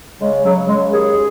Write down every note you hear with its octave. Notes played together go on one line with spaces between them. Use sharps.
C#3 G#3
C#3 F#3
C#3 G#3
D#2 G#4